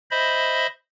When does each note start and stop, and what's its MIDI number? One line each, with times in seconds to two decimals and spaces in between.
0.11 0.67 72
0.11 0.67 75
0.11 0.67 76
0.11 0.67 83